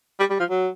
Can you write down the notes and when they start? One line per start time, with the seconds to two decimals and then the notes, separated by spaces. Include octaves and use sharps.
0.19 G3
0.30 G3
0.40 F3
0.50 F#3